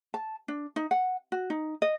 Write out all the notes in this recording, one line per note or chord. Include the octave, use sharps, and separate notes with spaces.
A5
D4
D#4
F#5
F#4
D#4
D#5